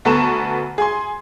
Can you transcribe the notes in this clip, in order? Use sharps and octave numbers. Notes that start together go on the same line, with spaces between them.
D2 B3 A4 A#5 C#6 E7
G#4 G#5 C6